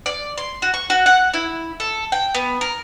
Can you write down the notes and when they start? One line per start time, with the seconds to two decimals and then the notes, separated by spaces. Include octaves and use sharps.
0.06 D5
0.38 C6
0.62 F#4
0.74 C#6
0.90 F#4
1.06 F#5
1.34 E4
1.80 A4
2.12 G5
2.35 B3
2.61 A#4